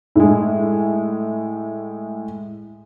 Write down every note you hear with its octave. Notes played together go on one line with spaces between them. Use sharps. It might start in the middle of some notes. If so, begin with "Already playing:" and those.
A2 G#3